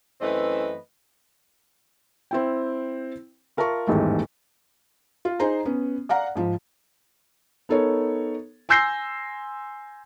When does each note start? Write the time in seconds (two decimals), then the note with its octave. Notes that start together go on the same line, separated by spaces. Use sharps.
0.21 F#2 E3 A3 C4 B4 D#5
2.31 C4 E4 G5
3.57 F4 A#4 E5 A5 C#6
3.87 A1 E2 G#2 D#3 G3 A3
5.25 F4
5.40 D#4 G#4 C5 A#5
5.65 B3 C#4
6.09 D5 F5 F#5 A#5
6.36 G#2 F3
7.69 B3 D#4 A4 A#4 C#5
8.69 G#5 C6 E6 G6 A#6 C7